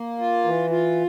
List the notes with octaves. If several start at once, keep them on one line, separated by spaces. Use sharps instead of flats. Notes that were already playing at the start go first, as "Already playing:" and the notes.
Already playing: A#3
F4
E3
F4